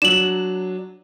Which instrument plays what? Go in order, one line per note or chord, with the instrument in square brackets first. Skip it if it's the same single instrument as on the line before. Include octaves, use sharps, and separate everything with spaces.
[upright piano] F#3 D4 [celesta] E7 F#7